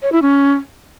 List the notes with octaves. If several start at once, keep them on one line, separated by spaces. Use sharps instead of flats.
C#5
E4
C#4